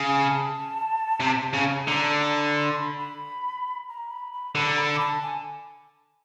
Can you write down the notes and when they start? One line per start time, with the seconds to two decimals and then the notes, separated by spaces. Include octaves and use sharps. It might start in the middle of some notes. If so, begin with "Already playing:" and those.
Already playing: C#3
0.08 G#5
0.31 A5
1.20 C3
1.53 C#3
1.87 D3 A#5
2.04 A5
2.21 A#5
2.37 B5
2.55 C6
2.77 B5
2.99 B5
3.89 A#5
4.11 B5
4.33 B5
4.55 D3 B5
4.69 A#5
4.78 B5
5.00 A5
5.22 G#5